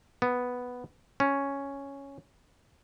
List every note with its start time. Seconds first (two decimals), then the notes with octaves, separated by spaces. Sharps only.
0.22 B3
1.20 C#4